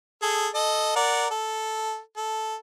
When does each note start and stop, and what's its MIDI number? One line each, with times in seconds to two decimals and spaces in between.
0.22 0.48 68
0.22 0.48 69
0.55 0.92 69
0.55 0.92 75
0.96 1.26 70
0.96 1.26 74
0.96 1.26 78
1.30 1.99 69
2.17 2.55 69